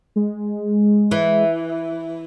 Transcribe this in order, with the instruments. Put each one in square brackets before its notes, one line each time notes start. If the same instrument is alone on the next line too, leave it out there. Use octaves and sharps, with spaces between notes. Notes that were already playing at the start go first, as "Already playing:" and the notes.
[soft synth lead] G#3
[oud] E3